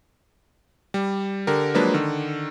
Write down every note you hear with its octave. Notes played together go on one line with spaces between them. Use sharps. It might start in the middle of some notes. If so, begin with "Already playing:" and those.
G3
D3 G4 A#4
F3 F#3 G#3 A#3 D4 B4
D3 D#3